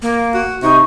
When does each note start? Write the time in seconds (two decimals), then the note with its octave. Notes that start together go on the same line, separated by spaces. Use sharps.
0.02 A#3
0.34 F#4
0.63 C3 D#4 C#6